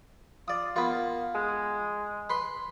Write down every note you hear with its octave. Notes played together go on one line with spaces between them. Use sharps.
F4 D5 D#6
A#3 B3 F4
G#3
B4 C6